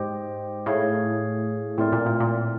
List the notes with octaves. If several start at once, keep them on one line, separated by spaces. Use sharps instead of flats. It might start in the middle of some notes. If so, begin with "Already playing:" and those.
Already playing: G#2 G4 C5 D#5 G5
A2 G#4 C#5 F5
A2 A3 C4 F4 A#4 D5
A#2
A#2
A#2